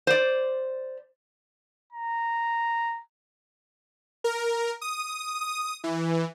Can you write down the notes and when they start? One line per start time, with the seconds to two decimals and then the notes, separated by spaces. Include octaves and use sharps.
0.07 C5 D5
1.93 A#5
4.24 A#4
4.81 D#6
5.41 D#6
5.84 E3